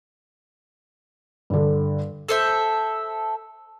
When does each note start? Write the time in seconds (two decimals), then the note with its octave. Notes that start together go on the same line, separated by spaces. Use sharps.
1.50 G2 D3
2.29 A4 C5 E5